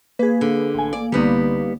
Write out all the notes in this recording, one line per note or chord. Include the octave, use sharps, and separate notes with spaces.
A#3 G#4 B4
D3
A1 G#5
D5
C2 D3 G3 B3 D#4